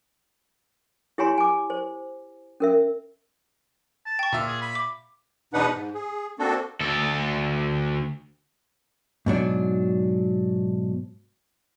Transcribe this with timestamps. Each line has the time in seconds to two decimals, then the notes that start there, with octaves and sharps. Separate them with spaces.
1.18 E4 G4 C#5 G#5 A#5 C6
1.38 G#5 D6
1.70 C5
2.60 C#4 A#4 E5
4.06 A5
4.19 G5 C#6
4.32 A#2 E5
4.47 G#4
4.62 B5
4.75 D6
5.54 E2 B2 D4 D#4 B4 F#5
5.73 G#2
5.95 G#4
6.39 A#3 C4 D4 F#4 A4
6.81 D2 A4
9.26 G#2 B2 F#3 D4